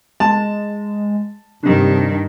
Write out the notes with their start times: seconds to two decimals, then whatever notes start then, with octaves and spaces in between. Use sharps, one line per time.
0.20 G#3 A5
1.63 G2 C3 D#3 D4